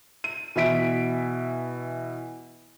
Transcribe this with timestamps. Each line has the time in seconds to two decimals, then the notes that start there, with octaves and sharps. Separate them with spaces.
0.24 D#7
0.56 B2 E3 E5 B6 D7